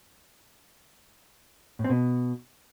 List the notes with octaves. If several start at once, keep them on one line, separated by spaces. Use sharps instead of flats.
A2
C4
B2